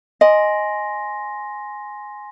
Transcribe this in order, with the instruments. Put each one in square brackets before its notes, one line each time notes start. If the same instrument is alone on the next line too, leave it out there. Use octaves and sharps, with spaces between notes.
[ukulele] D#5 [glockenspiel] G#5 C6 A#6